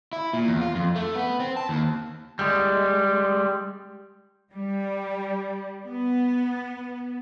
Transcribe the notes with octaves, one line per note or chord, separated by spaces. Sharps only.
E4
A#2
E2
F4
F2
A3
B3
C4
A5
D#2
G3 G#3
G3
B3